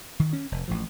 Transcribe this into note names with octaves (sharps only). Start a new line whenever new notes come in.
D#3
C#4
F1
A1 A2 F3